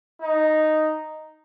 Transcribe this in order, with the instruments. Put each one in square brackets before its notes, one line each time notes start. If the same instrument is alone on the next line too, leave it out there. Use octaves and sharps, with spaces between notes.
[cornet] D#4